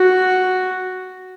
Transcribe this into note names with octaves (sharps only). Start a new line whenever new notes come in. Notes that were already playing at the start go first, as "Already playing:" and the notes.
Already playing: F#4